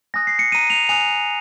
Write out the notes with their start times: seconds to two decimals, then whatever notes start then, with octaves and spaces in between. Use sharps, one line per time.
0.14 G#5 D#6 F#6 A#6
0.27 C7
0.39 C#7
0.51 A#5 D#6 F#6 D#7
0.70 F7
0.89 G#5 D#6 F#6 F7